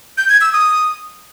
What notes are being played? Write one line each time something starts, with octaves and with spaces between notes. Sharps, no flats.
G6
G#6
E6
D#6